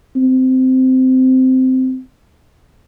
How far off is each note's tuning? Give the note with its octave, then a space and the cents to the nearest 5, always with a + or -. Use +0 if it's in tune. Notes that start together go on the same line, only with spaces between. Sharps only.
C4 -15